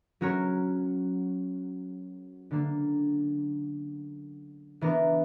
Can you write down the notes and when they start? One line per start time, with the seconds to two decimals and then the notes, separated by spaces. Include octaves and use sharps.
0.21 F#3 C#4 F#4 A#4 C#5
2.51 D3 A#3 D4
4.81 E3 B3 D4 A#4